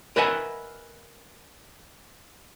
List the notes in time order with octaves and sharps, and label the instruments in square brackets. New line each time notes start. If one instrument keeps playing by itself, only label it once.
[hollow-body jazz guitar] A#4 B4 D#5 E5 F#5 G#5